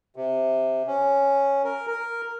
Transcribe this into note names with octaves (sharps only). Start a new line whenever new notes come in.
C3
C#4
A#4
A#4